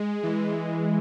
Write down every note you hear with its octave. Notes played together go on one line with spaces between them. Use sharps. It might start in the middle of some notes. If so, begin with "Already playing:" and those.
Already playing: G#3
E3